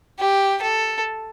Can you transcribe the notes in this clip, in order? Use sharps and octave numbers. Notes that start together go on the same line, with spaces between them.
G4
A4